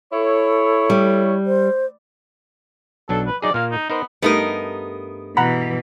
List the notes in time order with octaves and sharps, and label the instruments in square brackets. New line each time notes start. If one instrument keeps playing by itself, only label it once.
[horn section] E4 C#5 [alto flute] A4
[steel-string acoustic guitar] G3
[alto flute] C5
[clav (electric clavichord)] B1 F#3 D4 [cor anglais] A4
[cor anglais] B4
[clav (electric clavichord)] F#3 D#4 G#4 [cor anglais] D5
[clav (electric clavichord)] A#2 A#3 [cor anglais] F5
[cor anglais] D#4
[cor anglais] B3 [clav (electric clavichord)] D#4 A#4 C5
[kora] G2 A3 D#5 [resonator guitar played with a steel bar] B3 D#4 A#4
[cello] B2 E3 [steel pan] F#5 A#5 B5